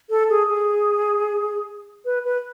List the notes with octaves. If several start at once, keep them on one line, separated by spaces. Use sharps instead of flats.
A4
G#4
G#4
B4
B4